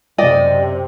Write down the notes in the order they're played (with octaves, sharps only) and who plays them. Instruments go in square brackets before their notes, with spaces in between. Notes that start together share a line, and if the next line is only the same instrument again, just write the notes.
[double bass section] F#2 C3 [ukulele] D5 D#5 G5